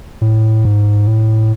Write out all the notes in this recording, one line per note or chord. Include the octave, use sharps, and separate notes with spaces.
A2
G#2
A2